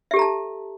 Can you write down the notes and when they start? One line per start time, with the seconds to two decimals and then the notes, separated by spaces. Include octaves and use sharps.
0.11 E5
0.14 G4
0.16 A4
0.19 A#5
0.22 A5